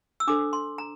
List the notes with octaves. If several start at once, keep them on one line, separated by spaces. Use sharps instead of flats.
E6
D4 A4 C5 D6
C6
A#5